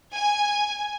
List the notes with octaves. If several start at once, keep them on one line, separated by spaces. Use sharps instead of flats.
G#5